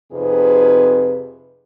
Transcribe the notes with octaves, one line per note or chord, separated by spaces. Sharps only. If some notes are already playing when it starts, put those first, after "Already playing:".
F2 C3 D#4 G#4 B4